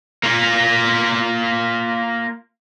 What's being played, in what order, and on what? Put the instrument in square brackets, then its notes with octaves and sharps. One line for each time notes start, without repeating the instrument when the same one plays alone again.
[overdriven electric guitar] A#3 F4